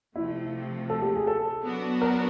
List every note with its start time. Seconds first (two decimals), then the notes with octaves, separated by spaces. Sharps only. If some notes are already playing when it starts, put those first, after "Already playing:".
0.16 C3 F3 A3 E4
0.90 A4
1.02 G4
1.15 G#4
1.27 A4
1.64 F#3 B3 D4 F#4
2.02 A#4